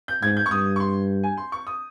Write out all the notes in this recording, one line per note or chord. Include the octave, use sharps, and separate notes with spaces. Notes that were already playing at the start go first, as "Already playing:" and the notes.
G6
G#2 G#6
G6
C#6
G2 D#6
C#6
C6
G#5
C6
C#6
D#6